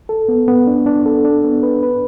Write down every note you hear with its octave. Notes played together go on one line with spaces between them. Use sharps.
A4
B3
B3
D4
D4
A4
D4
B3
B4
B4